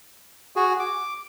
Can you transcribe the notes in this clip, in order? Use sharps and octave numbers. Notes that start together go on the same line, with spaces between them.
F#4 G#4
D6